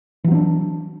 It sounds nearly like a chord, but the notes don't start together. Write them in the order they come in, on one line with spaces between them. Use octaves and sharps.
E3 F#3 C4 D4